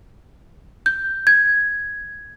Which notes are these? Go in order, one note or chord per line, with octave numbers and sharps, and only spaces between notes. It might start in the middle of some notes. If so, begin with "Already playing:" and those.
G6
G#6